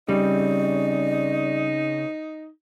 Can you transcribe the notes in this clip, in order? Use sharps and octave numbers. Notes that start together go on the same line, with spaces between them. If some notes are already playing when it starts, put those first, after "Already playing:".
C#3 G3 C4 D#4 D5